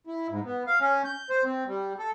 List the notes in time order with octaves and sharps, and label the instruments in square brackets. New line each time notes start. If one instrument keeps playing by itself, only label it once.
[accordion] E4
G#2
B3
F5
C#4
G6
C5
C4
G3
A4